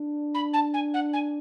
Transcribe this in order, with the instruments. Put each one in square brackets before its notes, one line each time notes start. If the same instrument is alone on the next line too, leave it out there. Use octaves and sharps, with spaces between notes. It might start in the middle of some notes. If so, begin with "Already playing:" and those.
Already playing: [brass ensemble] D4
[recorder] B5
A5
G#5
F#5
G#5